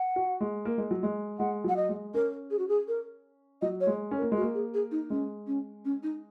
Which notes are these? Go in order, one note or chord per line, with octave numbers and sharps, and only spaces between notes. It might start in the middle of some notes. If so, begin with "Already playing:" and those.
Already playing: F#5
F#4
G#3
A#3
G#3
F#3
G#3
G#3 F#5
F#3 F#5
D#5
G#3
C#4 A#4
G#4
F#4
G#4
A#4
F#3 D#5
C#5
G#3
C#4
A#4
A#3
G#3
F#4
A#3
G#4
G#4
D#4
G#3 C#4
C#4
C#4
D#4